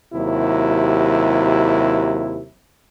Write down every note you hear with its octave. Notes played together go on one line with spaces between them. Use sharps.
D#2 C3 F#3 E4